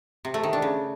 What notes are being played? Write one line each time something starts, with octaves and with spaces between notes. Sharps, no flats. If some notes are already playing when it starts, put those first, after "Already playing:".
C3
A3
D#3
D4
C#3